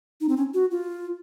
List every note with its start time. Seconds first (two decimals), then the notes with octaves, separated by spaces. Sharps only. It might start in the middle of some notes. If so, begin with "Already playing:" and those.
0.21 D#4
0.29 C4
0.37 C#4
0.54 F#4
0.71 F4